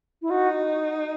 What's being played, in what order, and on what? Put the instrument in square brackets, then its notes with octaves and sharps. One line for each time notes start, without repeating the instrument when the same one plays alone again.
[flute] E4
[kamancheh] D#4 [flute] F#4